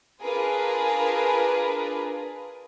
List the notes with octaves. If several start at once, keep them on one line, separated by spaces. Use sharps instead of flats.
D4 F4 G#4 A#4 B4